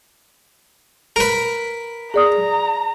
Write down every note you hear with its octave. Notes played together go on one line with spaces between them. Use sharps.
A#4 B4
G#4 D5 A#5 D#6